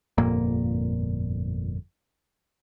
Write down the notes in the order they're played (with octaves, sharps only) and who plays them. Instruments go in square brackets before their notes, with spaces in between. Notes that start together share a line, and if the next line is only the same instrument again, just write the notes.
[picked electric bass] G1 F2 A#2 A#3